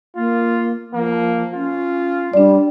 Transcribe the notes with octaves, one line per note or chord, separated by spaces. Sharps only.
A#3 F4
F3 A#3
C#4 F4
G3 D4 D5